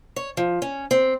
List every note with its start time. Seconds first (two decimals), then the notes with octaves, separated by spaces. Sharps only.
0.16 C#5
0.37 F3
0.62 C#4
0.91 C4